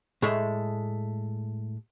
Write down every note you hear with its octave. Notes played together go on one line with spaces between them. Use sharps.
A2 G#3 A3